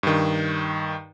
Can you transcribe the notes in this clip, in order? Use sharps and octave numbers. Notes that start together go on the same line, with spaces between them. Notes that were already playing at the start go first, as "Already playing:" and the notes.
G2 D#3